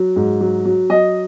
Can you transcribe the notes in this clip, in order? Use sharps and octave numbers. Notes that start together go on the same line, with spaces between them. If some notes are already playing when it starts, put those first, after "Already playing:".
Already playing: F#3
G#2
F#3
F#3
F#3 D#5